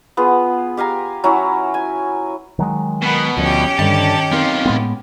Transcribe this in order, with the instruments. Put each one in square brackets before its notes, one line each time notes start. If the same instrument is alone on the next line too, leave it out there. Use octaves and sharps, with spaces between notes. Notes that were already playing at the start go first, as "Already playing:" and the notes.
[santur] B3 F4 G#4
G4 F5 G#5 A#5
F#3 C#4 E4
G#5
[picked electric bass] D#3 F#3 G#3
[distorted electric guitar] B2 [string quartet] B3 A#4
[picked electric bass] D2 [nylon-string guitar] F3 [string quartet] C#4 G4
[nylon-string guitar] G2 D3 D5 [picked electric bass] D#3 [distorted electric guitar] A5
[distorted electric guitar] B1 F4 [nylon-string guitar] C4 D#4 A#4
[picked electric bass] A2 G#3 B3